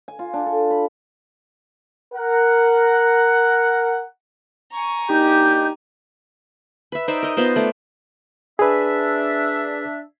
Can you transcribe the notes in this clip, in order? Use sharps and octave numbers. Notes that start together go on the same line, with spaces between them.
G#5
F4
D4
A4
B5
A#4 F#5
G#5 A#5 C#6
A#3 D4 D#4 G4 G6
B4 E5
D#4 C5 D5 E5
A#4 D#5
B3 F4 C5
A3 D5
D4 G#4 B4 E5